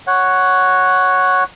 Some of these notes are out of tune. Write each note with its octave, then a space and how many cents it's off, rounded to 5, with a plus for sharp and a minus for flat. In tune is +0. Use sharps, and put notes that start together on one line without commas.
C#5 +0 F#5 +0